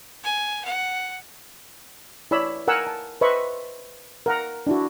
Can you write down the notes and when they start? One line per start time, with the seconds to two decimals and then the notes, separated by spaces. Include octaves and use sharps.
0.24 G#5
0.65 F#5
2.31 E4 C#5 D5 B5 E6
2.68 A#4 F#5 G#5 E6
2.87 A5
3.21 B4 C5 D#5 E5 B5 C#6
4.26 A#4 F#5 A#5
4.67 D4 E4 F#4